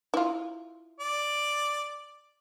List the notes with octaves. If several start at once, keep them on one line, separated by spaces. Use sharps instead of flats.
E4 F4
D5